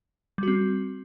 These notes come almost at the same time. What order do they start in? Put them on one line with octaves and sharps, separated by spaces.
G3 F#4 C4